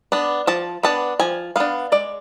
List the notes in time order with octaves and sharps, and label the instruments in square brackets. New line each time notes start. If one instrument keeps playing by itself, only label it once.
[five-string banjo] B3 D4
F3 A5
B3 D4 A5
F3 G#5
B3 D4 F5
G#3 D5